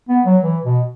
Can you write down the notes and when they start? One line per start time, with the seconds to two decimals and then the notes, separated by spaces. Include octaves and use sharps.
0.09 B3
0.25 F#3
0.42 E3
0.64 B2